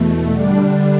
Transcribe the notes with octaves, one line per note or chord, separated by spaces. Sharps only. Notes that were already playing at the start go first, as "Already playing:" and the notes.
Already playing: E2 B2 A3
D3 G3 D4